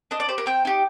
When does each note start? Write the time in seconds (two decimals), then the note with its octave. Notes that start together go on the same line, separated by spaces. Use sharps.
0.11 D4 D#5
0.20 D5
0.28 G4 C5
0.38 A#4
0.46 C4 G5
0.65 D#4 G4